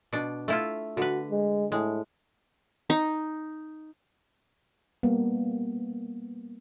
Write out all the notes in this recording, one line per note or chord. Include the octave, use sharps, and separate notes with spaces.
B2 D4
A3 E4 F4
D3 F#4 B4
G#3
A2 G#3
D#4
G3 A#3 B3